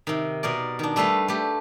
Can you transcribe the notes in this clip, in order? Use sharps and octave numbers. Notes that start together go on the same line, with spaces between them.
C3 D#3
B2 A#4 D5
D#3 D4
G3 A3 A4 B4 F5
A3 G4